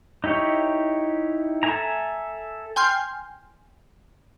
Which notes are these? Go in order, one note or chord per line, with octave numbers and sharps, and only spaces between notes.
D#4 E4 G4 C#5
A4 E5 G#5 A#5
G5 G#5 C6 F6 G6